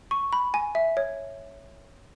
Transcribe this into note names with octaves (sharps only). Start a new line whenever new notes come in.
C#6
B5
G#5
E5
C#5